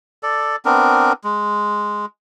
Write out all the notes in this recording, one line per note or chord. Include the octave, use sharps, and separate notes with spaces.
A4 D5
B3 C4 D4 A#4
G#3